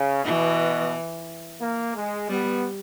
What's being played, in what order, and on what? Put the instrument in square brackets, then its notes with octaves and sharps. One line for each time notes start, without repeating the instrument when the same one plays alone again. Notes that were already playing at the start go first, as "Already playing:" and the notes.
Already playing: [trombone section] C#3
[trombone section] B2 [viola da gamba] E3
[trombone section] A#3
G#3
[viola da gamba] G3 [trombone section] B3